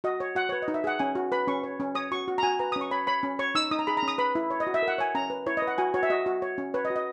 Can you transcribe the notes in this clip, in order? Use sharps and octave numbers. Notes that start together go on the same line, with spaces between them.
F#4 D#5
C#5
F#4 F#5
B4 C#5
D#5
D#4
E5
G#4 F#5
C#4 G#5
F#4
B4 B5
C#4 C#6
C#5
C#4
C#5 D#6
F#4 C#6
F#4
A#5
F#4 G#5
B4 A#5
C#4 D#6
C#6
C#5 B5
C#5 B5
C#4
C#5 C#6
D#4 E6
D#4 D#6
A#5
G#4 B5
A#5
C#4
D#6
B4 B5
E4
C#5
D#5
F#4
E5
A#4
F#5
C#5 G#5
C#4 A#5
B4
E4 C#5
D#5
B4
F#5
F#4 G#5
F#4 C#5
E5
F#4 D#5
F#4
C#5
C#4
B4 C#5
D#5
F#4
D#5